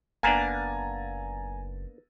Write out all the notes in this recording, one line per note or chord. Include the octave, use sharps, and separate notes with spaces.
F#1 A#3 B3 D4 G#5 A#5 A6